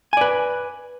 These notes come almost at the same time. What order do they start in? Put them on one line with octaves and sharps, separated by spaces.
G#5 D5 B4